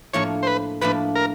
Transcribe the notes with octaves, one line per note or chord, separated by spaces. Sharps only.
A2 F3 A#3 D4 C#5
C5
B4
A2 F3 A#3 D4 B4
A#4